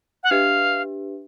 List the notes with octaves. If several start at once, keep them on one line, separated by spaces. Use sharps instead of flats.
F#5
D4 G4 B4 E5 F5